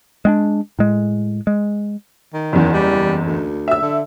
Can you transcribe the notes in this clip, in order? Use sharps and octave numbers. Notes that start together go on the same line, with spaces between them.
G#3 C4 D4
A2 G#3
G#3
D#3
F#1 E2
G3
D2
E5 E6
D3